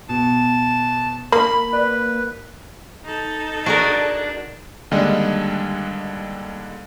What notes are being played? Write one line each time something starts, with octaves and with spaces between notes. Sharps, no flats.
B2 A5
A#3 B5
B4 D5
D#4 A4
D4 F#4 G#4 A#4
D#2 D3 G3 G#3 D4 D#5